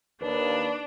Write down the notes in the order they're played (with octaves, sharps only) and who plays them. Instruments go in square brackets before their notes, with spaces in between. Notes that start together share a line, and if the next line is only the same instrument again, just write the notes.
[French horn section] D#2 [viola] D4 [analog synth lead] B4